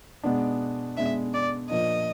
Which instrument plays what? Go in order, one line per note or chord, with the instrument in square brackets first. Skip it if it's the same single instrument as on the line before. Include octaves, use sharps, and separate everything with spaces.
[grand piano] B2 G#3 B3 D4
[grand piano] B2 G#3 B3 D4 [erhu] E5
[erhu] D5
[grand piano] A#2 F3 A#3 D4 [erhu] D#5